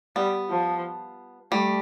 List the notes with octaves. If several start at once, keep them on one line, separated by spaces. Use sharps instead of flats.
G3 B3
F3
G3 A3